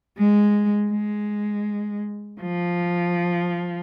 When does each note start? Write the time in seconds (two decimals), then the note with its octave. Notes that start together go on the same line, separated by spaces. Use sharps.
0.17 G#3
0.91 G#3
2.41 F3